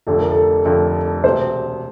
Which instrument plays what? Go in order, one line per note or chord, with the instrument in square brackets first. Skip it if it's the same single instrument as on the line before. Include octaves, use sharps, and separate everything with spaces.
[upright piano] F1 F2 D3 A3 [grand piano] A4
[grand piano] A#4
A4
[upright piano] F1 F2 D3 A3
[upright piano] E1 D2 C3 [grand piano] C5